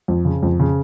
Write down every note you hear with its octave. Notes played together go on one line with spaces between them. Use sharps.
F2
C#3
F2
C#3